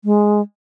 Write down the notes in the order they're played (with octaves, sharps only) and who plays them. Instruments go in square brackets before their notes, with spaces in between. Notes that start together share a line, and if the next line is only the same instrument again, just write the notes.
[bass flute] G#3